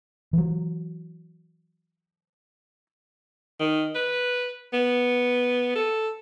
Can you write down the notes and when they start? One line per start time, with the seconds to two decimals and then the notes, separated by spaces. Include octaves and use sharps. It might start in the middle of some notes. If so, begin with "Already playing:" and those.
0.33 E3 F#3
3.60 D#3
3.95 B4
4.74 B3
5.76 A4